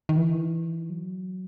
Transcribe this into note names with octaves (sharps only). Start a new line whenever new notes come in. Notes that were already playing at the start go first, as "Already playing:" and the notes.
D#3
E3
F#3